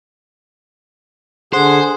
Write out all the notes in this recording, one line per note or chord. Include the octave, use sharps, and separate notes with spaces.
D3 G#4 C5 F#5